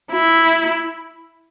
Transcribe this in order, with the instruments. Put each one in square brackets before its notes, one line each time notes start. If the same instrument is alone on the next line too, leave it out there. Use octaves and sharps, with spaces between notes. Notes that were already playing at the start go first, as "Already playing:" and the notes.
[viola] E4